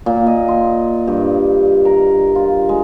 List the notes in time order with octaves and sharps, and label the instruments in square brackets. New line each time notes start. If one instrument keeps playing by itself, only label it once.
[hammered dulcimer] A#2
D#5
C6
G2
A#4
F4
G#3